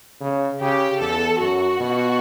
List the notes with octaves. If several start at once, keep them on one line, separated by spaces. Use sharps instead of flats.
C#3
C#3 G4
E2 A4
F#2 F#4
B2